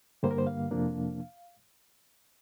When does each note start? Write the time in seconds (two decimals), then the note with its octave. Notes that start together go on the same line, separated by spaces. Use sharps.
0.23 G2 D3 G3 A#3 C5
0.31 A#4
0.38 C5
0.47 F5
0.71 F2 C3 F3 A#3 D4